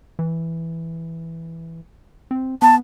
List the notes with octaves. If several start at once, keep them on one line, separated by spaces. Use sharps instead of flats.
E3
C4
B3 A5